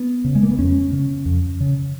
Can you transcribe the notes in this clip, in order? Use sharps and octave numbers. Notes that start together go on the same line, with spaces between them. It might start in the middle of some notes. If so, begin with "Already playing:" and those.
Already playing: B3
C#3
G#3
A#3
B3
F2 C#4
C#3
F2
C#3